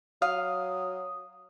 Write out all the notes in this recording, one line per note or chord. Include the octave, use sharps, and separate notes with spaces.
F#3 F5 D#6